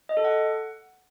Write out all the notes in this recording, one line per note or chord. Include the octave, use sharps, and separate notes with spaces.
D#5
A4
F#5